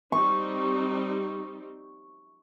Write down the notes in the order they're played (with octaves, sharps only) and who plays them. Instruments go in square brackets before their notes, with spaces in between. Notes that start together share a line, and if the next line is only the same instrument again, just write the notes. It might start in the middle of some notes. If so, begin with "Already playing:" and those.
[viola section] G3 C4 D#4 [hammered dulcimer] C#6